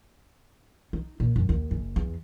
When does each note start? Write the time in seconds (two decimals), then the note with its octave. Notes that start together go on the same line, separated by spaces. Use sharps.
0.93 D#4
1.20 A#2
1.36 F#2
1.49 D#2
1.71 F#1
1.96 E2